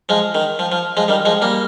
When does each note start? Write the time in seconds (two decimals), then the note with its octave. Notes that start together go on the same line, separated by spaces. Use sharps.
0.09 F3 G#3
0.35 D#3
0.59 F3
0.72 F3
0.97 F3 G#3
1.08 D#3 G3
1.25 F3 G#3
1.42 G3 A#3